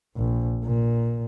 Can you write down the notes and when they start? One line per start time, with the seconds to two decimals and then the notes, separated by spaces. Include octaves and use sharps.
0.16 A#1
0.65 A#2